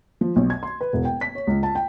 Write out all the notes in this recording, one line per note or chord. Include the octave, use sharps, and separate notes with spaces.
F3
B1
G#6
C6
B4
E1
G5
B6
C#5
C#2
A5
G5